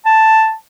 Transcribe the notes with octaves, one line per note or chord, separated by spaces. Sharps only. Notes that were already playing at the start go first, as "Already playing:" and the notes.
A5